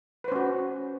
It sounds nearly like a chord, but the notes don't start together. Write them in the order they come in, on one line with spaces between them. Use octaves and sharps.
B4 C5 C#4 F#4